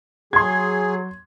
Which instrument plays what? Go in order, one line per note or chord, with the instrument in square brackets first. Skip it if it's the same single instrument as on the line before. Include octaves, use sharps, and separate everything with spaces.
[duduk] F#3 [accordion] G#4 [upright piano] C6 G#6